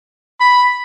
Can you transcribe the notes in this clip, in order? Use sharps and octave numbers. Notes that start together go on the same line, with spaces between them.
B5